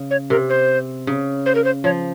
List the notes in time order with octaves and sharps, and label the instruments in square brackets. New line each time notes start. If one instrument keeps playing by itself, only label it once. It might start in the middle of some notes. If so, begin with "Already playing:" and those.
Already playing: [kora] C#3
[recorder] C#5
[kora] C3 [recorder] A#4
[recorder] C5
[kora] C#3
[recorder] C5
A#4
C5
[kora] F3 [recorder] C#5